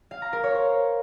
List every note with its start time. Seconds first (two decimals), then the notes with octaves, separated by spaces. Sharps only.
0.11 F5
0.22 A#5
0.33 A#4
0.44 C#5
0.54 C5